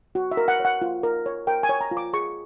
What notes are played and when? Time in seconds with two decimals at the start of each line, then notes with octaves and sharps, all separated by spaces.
0.15 F#4
0.31 E5
0.37 A#4
0.48 F#5
0.60 C#5
0.65 F#5
0.82 F4
1.03 A#4
1.26 C#5
1.47 A#4 G5
1.63 G#5
1.69 C#5
1.81 A#5
1.91 F4
1.97 D6
2.13 G#4 C#6